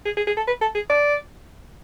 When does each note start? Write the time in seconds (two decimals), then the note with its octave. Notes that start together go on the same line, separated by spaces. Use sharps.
0.05 G#4
0.17 G#4
0.27 G#4
0.37 A4
0.47 B4
0.61 A4
0.75 G#4
0.90 D5